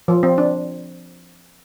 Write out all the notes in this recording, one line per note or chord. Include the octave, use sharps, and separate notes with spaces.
F3
C4
D4